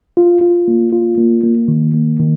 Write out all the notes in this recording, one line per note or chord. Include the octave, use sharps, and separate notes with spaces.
F4
F4
A#3
F4
A#3
A#3
D#3
A#3
D#3